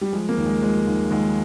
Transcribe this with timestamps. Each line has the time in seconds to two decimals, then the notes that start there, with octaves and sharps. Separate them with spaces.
0.01 G3
0.13 F3 G#3
0.29 A#3
0.37 D#2
0.46 G#3
0.62 F3 G#3
0.87 D#2
1.11 D#2 G#3